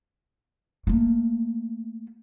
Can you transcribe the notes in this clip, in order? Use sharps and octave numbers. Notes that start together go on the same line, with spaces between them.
A3 A#3